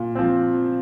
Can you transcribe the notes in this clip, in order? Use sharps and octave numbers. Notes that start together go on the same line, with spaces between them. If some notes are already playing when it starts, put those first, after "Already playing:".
Already playing: A#2
F3 C4